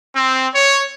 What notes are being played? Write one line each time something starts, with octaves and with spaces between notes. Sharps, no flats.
C4
C#5